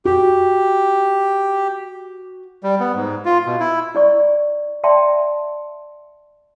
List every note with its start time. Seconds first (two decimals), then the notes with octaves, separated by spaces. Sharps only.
0.05 F#4 G4
2.63 G3
2.80 B3
2.95 G#2
3.25 F4
3.46 B2
3.60 E4
3.95 E4 D5 C#6
4.84 D5 E5 G5 A5 C6